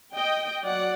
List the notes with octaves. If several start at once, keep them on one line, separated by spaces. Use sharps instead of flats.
D#5 G5
F#3 D5 F#5